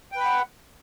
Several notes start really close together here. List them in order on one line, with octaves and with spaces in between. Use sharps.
G5 B4 B5 F#5